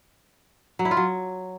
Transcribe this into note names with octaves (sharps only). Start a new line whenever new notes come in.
F#3
E4
F4
F#3